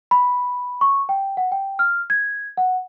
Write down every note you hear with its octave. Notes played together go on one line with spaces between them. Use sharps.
B5
C#6
G5
F#5
G5
F6
G#6
F#5